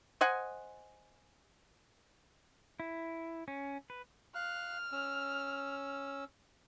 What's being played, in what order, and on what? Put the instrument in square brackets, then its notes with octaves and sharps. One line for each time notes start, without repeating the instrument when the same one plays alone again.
[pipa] C5 D#5 F#5 G#5
[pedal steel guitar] E4
C#4
B4
[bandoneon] F5 F#6 [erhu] F6
[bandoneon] C#4 E6